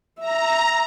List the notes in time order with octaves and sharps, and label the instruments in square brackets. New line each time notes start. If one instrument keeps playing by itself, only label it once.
[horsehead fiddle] E5 [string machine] A#5